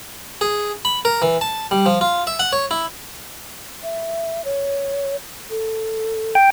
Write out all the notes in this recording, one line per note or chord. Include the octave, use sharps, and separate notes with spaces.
G#4
B5
A#4
E3
A5
G3
F3
F4
E5
F#5
C#5
E4
E5
C#5
A4
G5